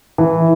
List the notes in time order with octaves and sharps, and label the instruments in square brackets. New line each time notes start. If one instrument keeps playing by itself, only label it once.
[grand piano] E3